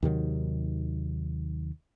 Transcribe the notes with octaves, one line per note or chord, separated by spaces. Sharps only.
D#2 C3 D#3 F#3